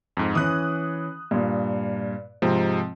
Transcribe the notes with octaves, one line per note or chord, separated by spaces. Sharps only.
F2 G#2
E3 C#4 D#6 F#6
G2 A#2
G#2 C3 F3 C4